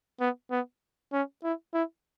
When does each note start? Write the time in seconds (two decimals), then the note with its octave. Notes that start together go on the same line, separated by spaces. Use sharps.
0.20 B3
0.51 B3
1.13 C#4
1.44 E4
1.74 E4